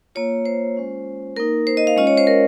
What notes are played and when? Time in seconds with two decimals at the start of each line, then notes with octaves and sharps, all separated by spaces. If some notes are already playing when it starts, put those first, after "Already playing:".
0.15 A#3 F4 C#5
0.45 C5
0.76 G#3 C#4 F4
1.36 A#3 D#4 A#4
1.67 C5
1.77 D#5
1.87 F5
1.97 G#3 C#4 F4 D#5
2.07 C#5
2.18 C5
2.27 A#4